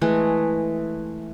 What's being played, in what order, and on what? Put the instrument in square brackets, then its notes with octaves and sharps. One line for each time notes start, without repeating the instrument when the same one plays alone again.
[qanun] E3 G#3 A3 G#4